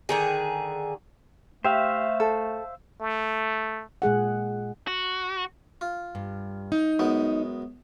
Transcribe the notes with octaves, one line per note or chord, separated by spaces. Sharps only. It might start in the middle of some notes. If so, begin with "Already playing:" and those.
D3 D#3 G#4
A3 G4 C5 E5 F5
A4
A3
A#2 G#3 G#4 F#5
F#4
F4
G2
D#4
F#2 G#3 B3